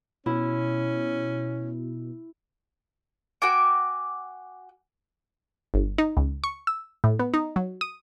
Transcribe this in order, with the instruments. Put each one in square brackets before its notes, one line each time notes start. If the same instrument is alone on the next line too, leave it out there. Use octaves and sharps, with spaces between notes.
[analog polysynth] B2 [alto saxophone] C#4 [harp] E4
[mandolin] F#4 G5 G#5 D6
[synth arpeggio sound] G1
D#4
C#2
C#6
E6
A2
B3
D#4
F#3
D#6